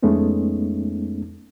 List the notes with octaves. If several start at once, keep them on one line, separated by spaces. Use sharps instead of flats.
F2 G#3 A3 B3 C#4 D#4